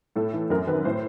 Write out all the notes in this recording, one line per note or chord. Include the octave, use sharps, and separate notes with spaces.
A2 A4
E3
F#2 A#4
D#3 B4
A2 C5